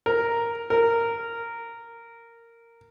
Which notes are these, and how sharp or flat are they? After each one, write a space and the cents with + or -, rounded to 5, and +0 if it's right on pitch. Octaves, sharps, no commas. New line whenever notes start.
A#4 +0
A#4 -10